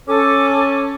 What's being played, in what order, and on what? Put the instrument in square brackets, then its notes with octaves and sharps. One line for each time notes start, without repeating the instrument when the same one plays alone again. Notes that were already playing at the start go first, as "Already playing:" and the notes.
[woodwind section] C#4 [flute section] A4 D6